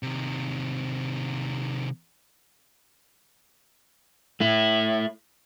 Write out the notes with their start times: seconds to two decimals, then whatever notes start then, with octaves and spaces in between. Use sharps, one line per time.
0.03 C3 D#3
4.40 A3 E4